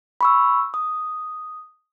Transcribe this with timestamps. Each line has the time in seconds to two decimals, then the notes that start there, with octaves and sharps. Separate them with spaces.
0.21 B5 C#6 E6
0.74 D#6